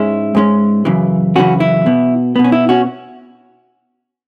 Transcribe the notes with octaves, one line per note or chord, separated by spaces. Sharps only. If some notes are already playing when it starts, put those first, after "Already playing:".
Already playing: G#2 G#3 C#4 E4
G#2 G#3 C#4
F#2 C#3 E3
F#2 C#3 E3 C#4 F#4
E4
B2 B3
B2 B3
C#4
E4
C#4 F#4